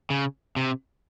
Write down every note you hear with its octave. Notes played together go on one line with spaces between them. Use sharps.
C#3
C3